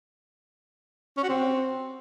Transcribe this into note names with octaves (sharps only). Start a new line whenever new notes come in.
C#4
F#4
C4